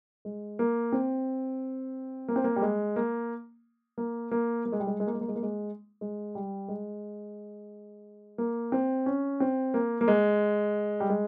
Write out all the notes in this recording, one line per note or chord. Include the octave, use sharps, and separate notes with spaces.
G#3
A#3
C4
A#3
C4
A#3
G3
G#3
A#3
A#3
A#3
A#3
G#3
G3
G#3
G#3
A#3
G#3
A#3
G#3
A#3
G#3
G#3
G3
G#3
A#3
C4
C#4
C4
A#3
A#3
G#3
G3
G#3